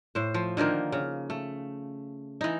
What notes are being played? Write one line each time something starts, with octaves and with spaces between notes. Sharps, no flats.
A2 C5
F3
D3 D#3 F3 A#3
C#3
A3
E3 D#4